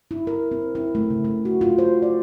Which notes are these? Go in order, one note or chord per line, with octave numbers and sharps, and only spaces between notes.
E4
A#4
C4
E4
A3
C#3
A3
F#4
F4
C5
D5